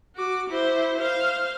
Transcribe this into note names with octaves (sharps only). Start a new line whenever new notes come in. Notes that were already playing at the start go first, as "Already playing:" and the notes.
F#4 D6
E4 C5
C5 F5